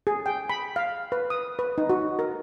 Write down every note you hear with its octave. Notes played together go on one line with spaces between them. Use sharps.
G#4
G5
B5
F5
B4
D#6
B4
D#4
F#4
A#4